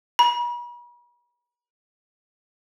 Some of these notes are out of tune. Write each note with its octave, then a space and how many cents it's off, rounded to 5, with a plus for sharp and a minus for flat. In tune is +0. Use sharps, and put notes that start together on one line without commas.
B5 -45